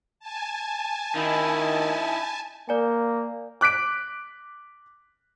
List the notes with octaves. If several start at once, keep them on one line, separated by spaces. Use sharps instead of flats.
G#5 A5
D#3 D#4 E4
A#3 A#4 D5 G#5
D6 F#6 B6 D7